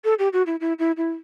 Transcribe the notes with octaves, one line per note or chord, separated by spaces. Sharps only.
A4
G4
F#4
E4
E4
E4
E4